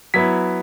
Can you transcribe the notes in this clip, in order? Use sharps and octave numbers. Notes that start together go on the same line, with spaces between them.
F#3 B3 E4 B6